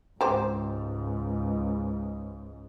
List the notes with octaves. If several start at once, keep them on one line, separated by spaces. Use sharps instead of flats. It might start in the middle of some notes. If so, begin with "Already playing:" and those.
C#2 G#2 G4 C5